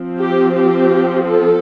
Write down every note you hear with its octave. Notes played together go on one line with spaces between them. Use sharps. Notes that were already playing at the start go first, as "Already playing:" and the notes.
Already playing: F3 C4
G4
G4
A4